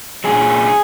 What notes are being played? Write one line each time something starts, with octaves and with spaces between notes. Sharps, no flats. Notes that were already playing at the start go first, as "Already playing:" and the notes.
A#2 F#3 G#4